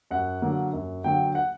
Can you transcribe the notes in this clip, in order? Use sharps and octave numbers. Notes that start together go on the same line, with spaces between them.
F#2 F#5
D3 F#3 A#3
F#2
D3 F#3 A#3 G5
F#5